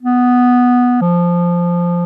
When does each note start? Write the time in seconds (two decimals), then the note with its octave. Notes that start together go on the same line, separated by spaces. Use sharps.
0.02 B3
1.01 F3